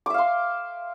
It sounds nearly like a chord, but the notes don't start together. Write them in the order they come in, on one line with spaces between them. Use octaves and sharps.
D6 E5 F5 C6